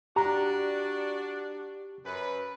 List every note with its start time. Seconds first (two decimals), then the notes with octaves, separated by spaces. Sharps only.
0.16 D4 F#4 G4 D5 A#5
2.04 F#2 B4